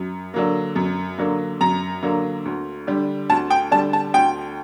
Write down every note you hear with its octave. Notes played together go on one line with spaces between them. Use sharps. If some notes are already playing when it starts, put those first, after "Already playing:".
Already playing: F#2
D3 F#3 A#3
F#2
D3 F#3 A#3
F#2 A#5
D3 F#3 A#3
D2
D3 G3
D2 A5
G5
D3 G3 A5
A5
D2 G5